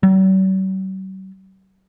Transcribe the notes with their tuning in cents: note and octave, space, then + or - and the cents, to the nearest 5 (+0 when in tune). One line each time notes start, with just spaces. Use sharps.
F#3 +45